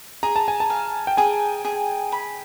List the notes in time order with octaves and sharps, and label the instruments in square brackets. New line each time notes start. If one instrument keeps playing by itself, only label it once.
[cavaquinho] G#4 [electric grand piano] A#5
[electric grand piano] A5
G#5
A5
[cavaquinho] F5
[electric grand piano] G5
[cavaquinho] G#4 [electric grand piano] G#5
[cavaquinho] G#4
B5